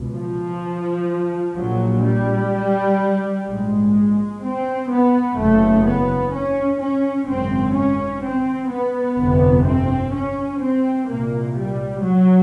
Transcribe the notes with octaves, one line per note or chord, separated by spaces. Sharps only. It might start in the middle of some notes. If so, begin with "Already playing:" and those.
Already playing: C#2 B2
F3
A#1 A#2 F#3
G3
A#1 G#2 G#3
C4
B3
F#1 E2 C#3 A3
B3
C#4
C#4
G#1 F#2 C#3 C4
C#4
C4
B3
G1 F2 C3
C4
C#4
C4
C2 A#2 A#3
G3
F#3